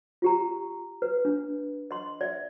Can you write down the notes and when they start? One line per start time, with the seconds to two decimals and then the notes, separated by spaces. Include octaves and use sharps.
0.22 F4 G4 A#5
1.02 B4
1.25 D4
1.91 D#5 C6
2.21 D5 E5